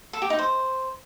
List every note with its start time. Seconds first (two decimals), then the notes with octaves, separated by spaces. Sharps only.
0.13 A4
0.22 G4
0.30 D#4
0.39 C5